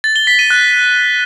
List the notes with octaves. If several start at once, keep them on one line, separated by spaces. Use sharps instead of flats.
A6
G7
B6
D#7
F#6